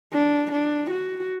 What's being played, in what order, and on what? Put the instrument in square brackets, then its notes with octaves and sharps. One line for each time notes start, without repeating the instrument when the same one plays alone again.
[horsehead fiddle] D4
D4
F#4